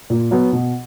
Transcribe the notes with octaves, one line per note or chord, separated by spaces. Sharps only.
A#2
F#3 B3
B2